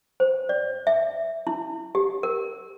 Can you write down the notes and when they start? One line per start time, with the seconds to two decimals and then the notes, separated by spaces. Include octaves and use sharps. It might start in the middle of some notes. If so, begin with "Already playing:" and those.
0.20 C5
0.49 D5
0.87 E5
1.47 E4
1.95 G4
2.23 A#4